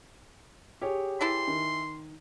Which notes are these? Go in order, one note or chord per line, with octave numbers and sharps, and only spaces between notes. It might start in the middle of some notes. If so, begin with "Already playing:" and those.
G4 G#4 C#5
E3 E4 A4 C6
D#3